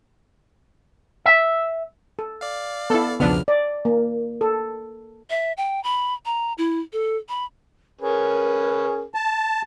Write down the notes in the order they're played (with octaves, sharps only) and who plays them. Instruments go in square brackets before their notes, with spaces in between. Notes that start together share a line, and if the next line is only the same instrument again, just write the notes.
[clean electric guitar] E5
[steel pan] A4
[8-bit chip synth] D5 F5
[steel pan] B3 E4 [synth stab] A4
[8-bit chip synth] B1 E2 F6 [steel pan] C#3 F3 [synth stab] B3 D4
[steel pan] D5
A#3
A4
[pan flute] E5
G5
B5
A#5
E4
A4
B5
[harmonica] C#4 G#4 B4 [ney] A#4
[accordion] A5